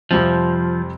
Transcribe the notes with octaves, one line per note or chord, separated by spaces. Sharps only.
F2 C3 F3 G3 C4